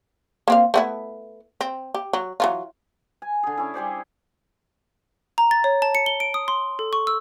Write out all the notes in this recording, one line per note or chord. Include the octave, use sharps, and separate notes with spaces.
A#3 C4 F5
A3 B3 E4
C4
G4
F#3
E3 F#3 F4
G#5
D3 G#4
C#4 E4
G3 G#4 C5 D5
A#5
A6
C#5
A5
C#7
G7
D7
D#6
C6
A4
C#6
E6